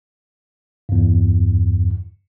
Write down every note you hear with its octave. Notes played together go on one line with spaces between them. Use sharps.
E2 G2